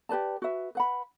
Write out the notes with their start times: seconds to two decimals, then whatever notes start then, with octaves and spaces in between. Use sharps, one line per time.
0.09 G4 B4 D5 A5
0.42 F#4 B4 E5
0.75 B4 F#5 B5